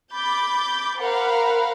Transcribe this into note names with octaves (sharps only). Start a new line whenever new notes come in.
B5 D6 G6 A6
A#4 C5 F5 F#5 B5